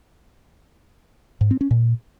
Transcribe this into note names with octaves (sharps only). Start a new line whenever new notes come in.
G#2
C4
C#4
A#2